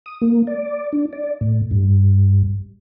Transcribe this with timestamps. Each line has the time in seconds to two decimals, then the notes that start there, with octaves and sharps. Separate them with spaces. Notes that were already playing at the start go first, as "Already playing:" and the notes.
0.06 D#6
0.21 A#3
0.47 D5
0.93 D4
1.13 D5
1.41 A2
1.71 G2